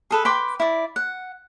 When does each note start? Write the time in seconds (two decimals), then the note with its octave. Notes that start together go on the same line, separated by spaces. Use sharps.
0.11 G#4 A4 B4
0.25 B4 G5 C6 D6
0.60 E4 D5
0.96 F#5